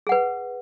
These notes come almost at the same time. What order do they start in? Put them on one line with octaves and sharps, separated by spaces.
G#4 F#5 B4